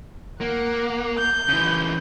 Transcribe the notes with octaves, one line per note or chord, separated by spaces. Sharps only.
A#3 F#5
G6
C#3 E3